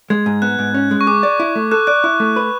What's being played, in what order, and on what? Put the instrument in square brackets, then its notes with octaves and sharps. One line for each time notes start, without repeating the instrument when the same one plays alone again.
[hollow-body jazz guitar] G#3 [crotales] G#6
[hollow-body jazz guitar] G#2
[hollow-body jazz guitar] B3 [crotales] F#6
[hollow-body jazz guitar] G#2
C#4
G#3
[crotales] C#6
[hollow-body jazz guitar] G#4 [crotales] D6
[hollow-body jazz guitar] D5
E4
A3
[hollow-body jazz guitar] A4 [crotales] F#6
[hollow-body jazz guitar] D5 [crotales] F#6
[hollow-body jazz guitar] E4
A3
B4